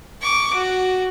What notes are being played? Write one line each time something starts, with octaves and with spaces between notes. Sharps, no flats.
C#6 D6
F#4